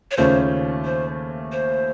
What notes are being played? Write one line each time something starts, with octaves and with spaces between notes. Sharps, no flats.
C#5
D#2 C#3 A3 C#4 F4 C5
C5
C5